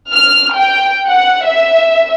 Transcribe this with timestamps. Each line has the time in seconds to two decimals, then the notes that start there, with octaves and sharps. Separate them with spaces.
0.13 F6
0.56 G5
1.09 F#5
1.46 E5